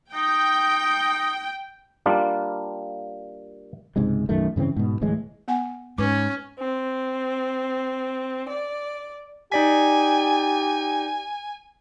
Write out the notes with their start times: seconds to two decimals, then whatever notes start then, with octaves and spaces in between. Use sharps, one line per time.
0.14 D#4 G5
2.06 G3 A#3 D4 F4
3.96 C#2 G#2 C3 G#3
4.29 B1 F#2 D#3 A3
4.56 G2 C#3 E3 C4
4.76 G#2 B2
5.01 D1 A2 E3 G#3
5.48 B3 F#5 G#5
5.98 G#2 C#4 B4 D6
6.59 C4
8.49 D5
9.52 D#4 G4 D5 G#5 B6